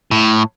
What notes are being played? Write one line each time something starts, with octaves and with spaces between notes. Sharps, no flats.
A2